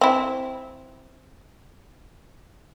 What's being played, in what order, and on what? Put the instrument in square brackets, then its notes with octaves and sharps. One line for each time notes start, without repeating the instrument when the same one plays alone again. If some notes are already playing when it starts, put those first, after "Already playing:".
[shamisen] C4 E4